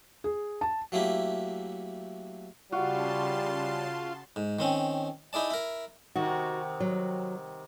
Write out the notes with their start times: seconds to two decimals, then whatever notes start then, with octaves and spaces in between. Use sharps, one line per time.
0.24 G#4
0.61 A5
0.92 F#3 A3 A#3 E4 G4
2.72 C#3 G3 F4 F#4 A5 C6
4.36 G#2
4.59 D#3 C4 C#4
5.33 D#4 E4 G#4 D5 A5
5.51 E4 A#4
6.16 C3 D#3 F#4
6.80 F#3